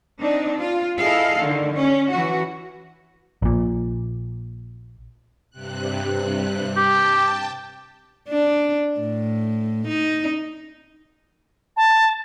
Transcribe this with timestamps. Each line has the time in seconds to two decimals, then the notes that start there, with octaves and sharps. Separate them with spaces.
0.21 C4 D4 D#4
0.61 F4
0.99 E4 G#4 A4 D#5 F5
1.39 D3 D#3
1.74 C#4
2.10 E3 F#4
3.42 A#1 A#2
5.51 G2 C3 F#6
6.77 G4 G5 A5
8.29 D4
9.00 A2
9.88 D#4
11.77 A5